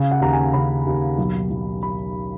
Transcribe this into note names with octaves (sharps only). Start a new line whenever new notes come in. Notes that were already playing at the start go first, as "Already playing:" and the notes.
Already playing: C#3 F5
F#5
D#2 A#5
G#5
C#3 B5
D#2
B1
B1
B5